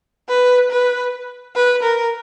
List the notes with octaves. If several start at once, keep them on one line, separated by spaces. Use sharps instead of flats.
B4
B4
B4
A#4